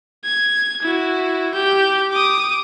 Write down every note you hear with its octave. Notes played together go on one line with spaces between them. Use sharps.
G#6
E4 F#4
G4 G6
D6 D#6